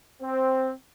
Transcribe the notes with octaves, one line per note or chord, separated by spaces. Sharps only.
C4